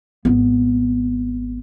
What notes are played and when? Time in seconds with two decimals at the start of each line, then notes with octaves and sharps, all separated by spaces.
0.25 G#1 B3